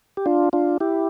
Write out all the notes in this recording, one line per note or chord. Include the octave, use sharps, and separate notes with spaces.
G4
D4 F4
D4 F4
E4 G4